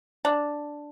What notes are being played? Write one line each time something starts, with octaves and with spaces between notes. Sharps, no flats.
D4